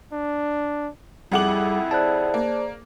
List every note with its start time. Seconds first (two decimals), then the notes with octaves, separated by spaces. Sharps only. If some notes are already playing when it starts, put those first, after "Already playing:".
0.13 D4
1.32 F2 G3 E4 G#4 F#5 D6 F#7
1.91 G#4 C5 D5 A5 F#6
2.34 A#3